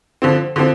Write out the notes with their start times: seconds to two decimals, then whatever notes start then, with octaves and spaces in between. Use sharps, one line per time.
0.22 D3 F3 C4
0.56 D3 F3 C4